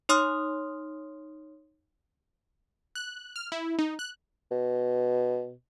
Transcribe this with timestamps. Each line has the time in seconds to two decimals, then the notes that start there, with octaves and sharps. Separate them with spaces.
0.09 D#4 C#5 C6 D#6 F6
2.95 F#6
3.36 F6
3.52 E4
3.79 D#4
3.99 F#6
4.51 B2